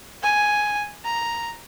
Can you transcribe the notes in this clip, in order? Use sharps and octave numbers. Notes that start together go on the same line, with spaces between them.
G#5
A#5